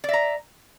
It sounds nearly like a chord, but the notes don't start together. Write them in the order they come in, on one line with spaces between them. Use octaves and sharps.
D5 E5 A#5